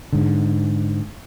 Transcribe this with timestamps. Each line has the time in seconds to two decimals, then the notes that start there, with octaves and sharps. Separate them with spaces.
0.13 G#2 D3